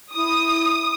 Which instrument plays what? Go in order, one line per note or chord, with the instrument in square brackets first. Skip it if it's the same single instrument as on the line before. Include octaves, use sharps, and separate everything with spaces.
[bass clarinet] E4 [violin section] D#6